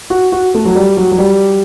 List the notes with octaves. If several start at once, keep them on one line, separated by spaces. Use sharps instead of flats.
F#4
F#4
A3
F#3
G3
F#3
F#3
G3